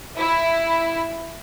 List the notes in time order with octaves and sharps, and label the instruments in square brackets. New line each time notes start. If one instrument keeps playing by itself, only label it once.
[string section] E4